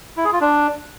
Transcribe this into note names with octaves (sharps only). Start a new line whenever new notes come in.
E4
G#4
F4
D4